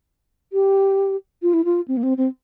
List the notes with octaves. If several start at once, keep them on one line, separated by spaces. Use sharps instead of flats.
G4
F4
E4
F4
C4
A#3
C4
C4